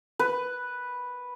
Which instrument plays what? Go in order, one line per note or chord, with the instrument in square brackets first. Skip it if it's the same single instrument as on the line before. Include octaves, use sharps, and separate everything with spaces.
[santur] B4